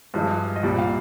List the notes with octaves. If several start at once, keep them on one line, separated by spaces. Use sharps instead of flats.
G2 F3 G#3
D#5
C2 A#2 G3 D5
F5